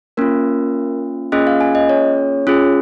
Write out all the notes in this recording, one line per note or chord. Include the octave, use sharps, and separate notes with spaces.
A#3 C#4 F4 A#4
A#3 C#4 F4 G#4 D#5
F5
G#5
D#5
C#5
C#4 F4 G#4